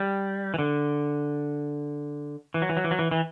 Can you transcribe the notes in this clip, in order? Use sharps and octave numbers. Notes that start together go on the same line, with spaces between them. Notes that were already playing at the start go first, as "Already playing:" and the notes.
Already playing: G3
E3
D3
E3
F#3
E3
F#3
E3
F#3
E3
E3